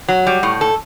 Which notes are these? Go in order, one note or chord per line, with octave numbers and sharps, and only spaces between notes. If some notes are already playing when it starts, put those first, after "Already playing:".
F#3
G3
A2
A4